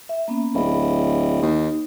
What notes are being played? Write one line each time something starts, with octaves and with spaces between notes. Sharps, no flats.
E5
A#3 B3 C#4
D1 G#4 B5
D#2 D#4